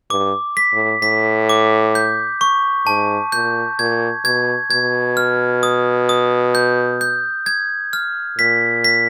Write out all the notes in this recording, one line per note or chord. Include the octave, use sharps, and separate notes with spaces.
G2 D6
B6
A2
A2 B6
D6
G6
C#6
G#2 A5
A#2 G6
A#2 G#6
B2 G#6
B2 G#6
F6
D#6
D#6
G6
G6
G#6
F6
A#2 B6
B6